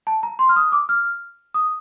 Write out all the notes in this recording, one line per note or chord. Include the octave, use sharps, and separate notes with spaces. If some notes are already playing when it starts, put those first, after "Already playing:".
A5
A#5
C6
F6
D#6
D6
F6
D#6